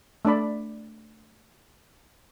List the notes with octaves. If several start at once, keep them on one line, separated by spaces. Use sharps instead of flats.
A3 D4 D5 B5